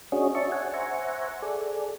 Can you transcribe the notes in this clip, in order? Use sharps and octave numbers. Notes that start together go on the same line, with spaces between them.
C#4 D4 F#4 G#4 C#5 D#5
C#5 D5 E5 A5 C#6
C#5 F#5 G#5
C5 E5 F#5 G#5 A#5 C#6
G#4 A4 D5